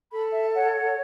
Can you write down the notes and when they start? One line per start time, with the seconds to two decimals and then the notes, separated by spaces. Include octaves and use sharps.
0.11 A4 B5
0.32 E5
0.54 C#5 F#5
0.75 F#5